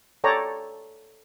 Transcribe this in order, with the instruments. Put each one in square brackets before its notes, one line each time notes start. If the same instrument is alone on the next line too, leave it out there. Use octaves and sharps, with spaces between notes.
[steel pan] A4 C#5 D5 G5 A#5